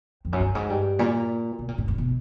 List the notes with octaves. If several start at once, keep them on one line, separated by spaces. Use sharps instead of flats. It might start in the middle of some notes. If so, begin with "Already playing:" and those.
F2
F#2
G2
G#2
G2
A#2
B2
A#2
A2
G2
B2